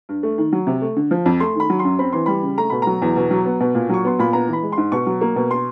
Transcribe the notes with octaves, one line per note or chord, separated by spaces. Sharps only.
G2
A3
D#3
F#3
C3
A3
D3
F3
F2
A3 C6
D#3 B5
F#3
C6
F#2
C4 B5
E3 C6
G3 B5
C#3
A3 A#5
B2 B5
F#3 A#5
E2
B2
F#3
B3
B2
A#2
F#3 C#6
B3 C6
A#2 B5
B3 A#5
E3 B5
G#3
C6
G#2
B2 C#6
F#3
A#3
B2
C6